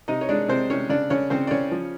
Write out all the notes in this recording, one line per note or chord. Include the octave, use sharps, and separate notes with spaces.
C3 D#4 D#5
C#5
G#3 D4 D5
C3 C4 C5
C3 C#4 C#5
C#3 D4 D5
C#3 C#4 C#5
C#3 C4 C5
D5
C#3 C#4 C#5
F3